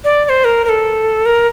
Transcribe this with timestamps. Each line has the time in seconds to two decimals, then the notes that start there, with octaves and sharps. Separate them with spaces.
0.04 D5
0.25 D5
0.29 C5
0.45 A#4
0.65 A#4
0.69 A4
1.26 A#4